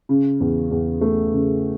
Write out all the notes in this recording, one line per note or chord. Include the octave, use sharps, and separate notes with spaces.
C#3
E2
E2
A3
C#3